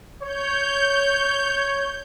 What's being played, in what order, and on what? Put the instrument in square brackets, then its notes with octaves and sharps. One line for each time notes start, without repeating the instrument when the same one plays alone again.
[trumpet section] C#5 [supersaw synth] G6